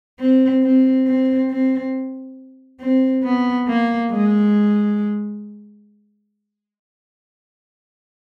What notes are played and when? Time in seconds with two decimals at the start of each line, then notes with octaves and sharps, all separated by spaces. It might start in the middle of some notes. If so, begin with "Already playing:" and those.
0.19 C4
0.63 C4
1.07 C4
1.50 C4
2.81 C4
3.24 B3
3.68 A#3
4.11 G#3